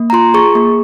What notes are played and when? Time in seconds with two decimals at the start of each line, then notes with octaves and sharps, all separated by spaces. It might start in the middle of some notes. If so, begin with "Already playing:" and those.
Already playing: A#3
0.10 A#5
0.13 F4 C6
0.34 G#4 C#6
0.55 A#3